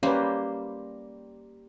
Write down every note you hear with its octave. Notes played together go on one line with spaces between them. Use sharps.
G3 A#3 C#4 B4 C5